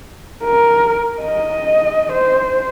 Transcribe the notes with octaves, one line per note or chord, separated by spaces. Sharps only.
A#4
D#5
C5